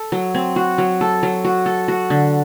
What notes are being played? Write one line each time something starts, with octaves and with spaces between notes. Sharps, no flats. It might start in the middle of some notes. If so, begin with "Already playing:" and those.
Already playing: A4
F#3
C4
F#4
F#3
A4
F#3
F#4
A4
F#4
D3